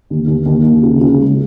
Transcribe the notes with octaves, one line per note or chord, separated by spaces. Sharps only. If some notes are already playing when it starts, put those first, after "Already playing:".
D#2
D#2
D#2
D#2
C#3
C#3
C#2